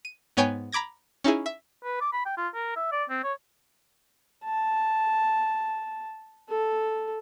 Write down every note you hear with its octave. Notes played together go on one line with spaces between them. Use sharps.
D#7
G#2 B3 C#5 G5 G#5 G6
A#5 B5 D6 G#6 A#6
C#4 D#4 E4 G#4
E5
B4
D6
B5
G5
F4
A#4
E5
D5
C4
C#5
A5
A4